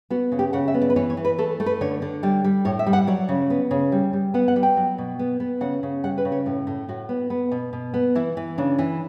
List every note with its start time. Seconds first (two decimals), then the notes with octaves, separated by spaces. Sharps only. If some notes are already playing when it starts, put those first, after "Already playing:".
0.10 B3 F#4
0.32 C#3
0.39 G4
0.53 C#3 F#5
0.68 E5
0.74 B3
0.81 D5
0.90 B4
0.96 E3 C#5
1.10 C#5
1.17 E3
1.25 B4
1.38 A3 A4
1.60 A3
1.66 B4
1.81 D3 C#5
2.02 D3
2.23 G3 D5
2.44 G3
2.65 A2 C#5
2.79 E5
2.87 G3
2.93 F#5
3.07 F#3 D5
3.29 C#3
3.50 B3
3.71 C#3
3.92 G3
4.13 G3
4.34 B3 F#5
4.48 F#5
4.56 G3
4.63 G5
4.77 F#3
4.98 B2
5.19 B3
5.40 B3
5.61 C#3 F#5
5.83 C#3
6.04 G3 F#5
6.18 B4
6.25 C#3
6.32 C#5
6.46 A2
6.67 A2
6.88 A2 F#4
7.09 B3
7.30 B3
7.52 B2
7.73 B2
7.94 B3
8.15 E3 E4
8.37 E3
8.58 C#3 D4
8.79 E3